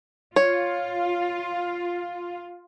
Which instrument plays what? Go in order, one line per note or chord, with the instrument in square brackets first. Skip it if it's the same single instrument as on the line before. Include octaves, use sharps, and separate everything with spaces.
[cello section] F4 [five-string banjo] C#5